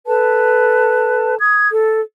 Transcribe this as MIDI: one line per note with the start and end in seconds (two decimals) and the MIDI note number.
0.07 1.36 69
0.07 1.36 71
0.07 1.36 81
1.40 1.68 87
1.40 1.68 92
1.71 2.02 69